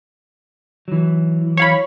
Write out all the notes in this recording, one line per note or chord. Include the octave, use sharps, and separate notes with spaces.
E3 F#3
C#5 F5 B5